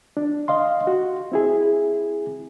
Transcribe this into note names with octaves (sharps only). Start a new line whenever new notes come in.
D4
D#5 F5 C6
F#4
C4 E4 G#4